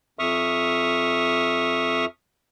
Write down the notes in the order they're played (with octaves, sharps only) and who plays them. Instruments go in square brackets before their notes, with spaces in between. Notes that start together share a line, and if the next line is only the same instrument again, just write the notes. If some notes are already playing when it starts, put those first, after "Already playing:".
[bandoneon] F2 E5 C#6 D#6 F6